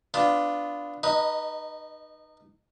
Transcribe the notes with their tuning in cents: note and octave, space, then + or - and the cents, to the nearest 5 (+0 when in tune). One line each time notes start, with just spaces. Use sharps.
B3 +15 D4 +0 F4 +0
D#4 -25 B4 -25 D#5 +5